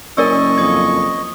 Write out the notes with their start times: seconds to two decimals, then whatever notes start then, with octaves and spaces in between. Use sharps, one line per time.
0.17 F#1 C#4 A#4 D5 D#5 C#6 E6
0.58 F2 D#6 G#6